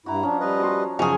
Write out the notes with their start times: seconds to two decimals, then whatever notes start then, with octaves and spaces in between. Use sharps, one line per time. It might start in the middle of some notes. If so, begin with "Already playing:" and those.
0.06 G2 E4 F#4 A#5
0.23 F3 C#4 D4
0.40 G3 B4 D#5
0.60 F#4 G4 C6
0.99 F#2 C#3 F3 C#4 D#4 F#4 G#4